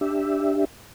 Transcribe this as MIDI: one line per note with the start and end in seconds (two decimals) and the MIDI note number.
0.01 0.65 62
0.01 0.65 67
0.01 0.65 76